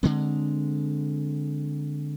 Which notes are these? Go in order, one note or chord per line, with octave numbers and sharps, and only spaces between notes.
D3 G#3 C4